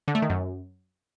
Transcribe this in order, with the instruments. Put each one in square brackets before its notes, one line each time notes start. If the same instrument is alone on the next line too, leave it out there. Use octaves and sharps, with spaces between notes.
[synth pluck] D3
A3
D#3
F#2